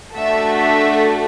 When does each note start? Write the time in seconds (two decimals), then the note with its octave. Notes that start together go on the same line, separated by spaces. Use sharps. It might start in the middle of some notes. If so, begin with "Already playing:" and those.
0.17 A3 D4 F#4 A4 E5
0.57 E5